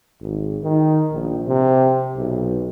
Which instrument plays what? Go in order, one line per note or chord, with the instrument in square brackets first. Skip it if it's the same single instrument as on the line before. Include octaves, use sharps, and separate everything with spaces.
[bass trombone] G#1
D#3
A#1
C3
B1